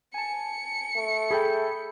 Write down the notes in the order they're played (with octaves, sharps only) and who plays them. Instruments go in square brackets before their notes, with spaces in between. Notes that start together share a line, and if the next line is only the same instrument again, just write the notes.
[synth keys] G#5 A5 [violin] C#7
[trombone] A3
[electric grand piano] G#4 A4 G5 [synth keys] B5 G6